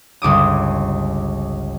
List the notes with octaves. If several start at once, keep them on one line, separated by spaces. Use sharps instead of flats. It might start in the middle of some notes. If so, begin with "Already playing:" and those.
G1 C#2 D6 D#6